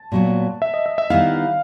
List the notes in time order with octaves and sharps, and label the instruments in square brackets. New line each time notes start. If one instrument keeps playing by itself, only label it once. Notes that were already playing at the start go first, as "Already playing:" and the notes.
Already playing: [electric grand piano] A5
[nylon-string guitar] A#2 F#3 B3
[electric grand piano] E5
D#5
E5
E5
[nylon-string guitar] D#3 G3 B3 E4 [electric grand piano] F5